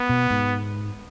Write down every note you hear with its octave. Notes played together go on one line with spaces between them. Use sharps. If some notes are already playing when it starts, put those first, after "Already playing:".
Already playing: B3
B2
G#2